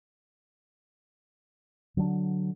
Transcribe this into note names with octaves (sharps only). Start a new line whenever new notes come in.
D3 F#3 A#3 D4